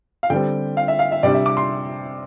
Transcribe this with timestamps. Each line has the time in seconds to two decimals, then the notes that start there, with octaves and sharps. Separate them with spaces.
0.23 F5
0.30 D3 G3 C4 G5
0.77 F5
0.88 E5
0.99 F5
1.12 E5
1.23 C3 G3 D4 D5
1.34 E5
1.46 D6
1.57 C6